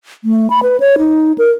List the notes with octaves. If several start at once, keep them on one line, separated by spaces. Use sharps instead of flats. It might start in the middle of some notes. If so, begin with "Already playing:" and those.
A3
B5
B4
C#5
D#4
A#4